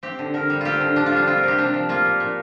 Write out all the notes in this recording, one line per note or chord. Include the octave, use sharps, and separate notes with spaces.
C4 G4
D3
D3 A#4
G3
C4 F4 G4
D3
D3 D4
F4
G3 D4
C4 F4
A#4
C3 G4
C3 D4
F3
A#3 F4
A#2
A#2